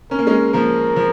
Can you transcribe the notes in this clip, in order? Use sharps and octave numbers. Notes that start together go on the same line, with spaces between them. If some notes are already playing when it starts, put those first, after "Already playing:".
C#4 A#4
A#3
G#3 C#4
F3 A#3 A#4
F3